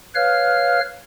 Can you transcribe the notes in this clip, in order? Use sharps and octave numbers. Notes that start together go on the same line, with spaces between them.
B4 C#5 F5 F6